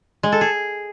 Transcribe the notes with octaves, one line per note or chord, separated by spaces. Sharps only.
G#3
A4
G#4